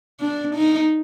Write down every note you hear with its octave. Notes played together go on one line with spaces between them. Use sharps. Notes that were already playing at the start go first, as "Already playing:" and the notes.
D4
D#4